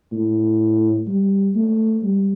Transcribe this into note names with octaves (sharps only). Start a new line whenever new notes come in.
A2
G3
A3
G3